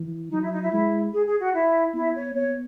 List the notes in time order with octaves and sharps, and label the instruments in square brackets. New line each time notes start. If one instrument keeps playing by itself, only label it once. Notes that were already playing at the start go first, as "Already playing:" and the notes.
Already playing: [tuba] E3
[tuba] F#3 [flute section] D#4
[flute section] E4
D#4
E4
[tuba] G#3 [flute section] E4
[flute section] G#4
G#4
F#4
E4
[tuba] B3 [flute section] E4
[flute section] C#5
[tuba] B3 [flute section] C#5